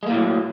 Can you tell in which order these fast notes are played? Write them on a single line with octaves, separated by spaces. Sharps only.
G#3 A#3 A2 F#3